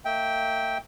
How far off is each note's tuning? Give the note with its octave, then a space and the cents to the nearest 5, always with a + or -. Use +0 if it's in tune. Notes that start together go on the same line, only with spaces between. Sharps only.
A#3 -40 E5 -30 G5 +0